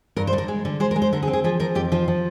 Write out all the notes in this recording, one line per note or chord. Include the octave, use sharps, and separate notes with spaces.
G2 A#4
C5
D3
A#4
G#3
D3
G#3 C5
A#4
G#3
C5
D3 A#4
G#4
C4
G#4
F3 G#4
F3 A#4
F2 G4
F3 F4
F3